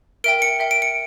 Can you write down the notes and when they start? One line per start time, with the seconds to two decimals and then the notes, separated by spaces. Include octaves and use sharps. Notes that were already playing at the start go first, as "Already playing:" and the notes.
0.24 A#4 E5 G5 D7
0.42 C#7
0.59 A#4 E5 G5
0.71 D7
0.82 C#7